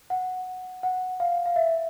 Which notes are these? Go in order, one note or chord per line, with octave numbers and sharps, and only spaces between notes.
F#5
F#5
F5
F5
E5